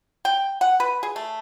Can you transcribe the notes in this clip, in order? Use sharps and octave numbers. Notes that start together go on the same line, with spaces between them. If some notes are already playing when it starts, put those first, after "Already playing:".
G5
F#5
B4
G#4
A3